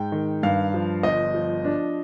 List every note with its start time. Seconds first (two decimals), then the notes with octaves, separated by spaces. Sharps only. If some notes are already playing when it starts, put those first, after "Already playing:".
Already playing: G#2 G5
0.12 D#3
0.43 G2 F5
0.74 F3
1.03 G1 D#5
1.34 F3
1.64 D4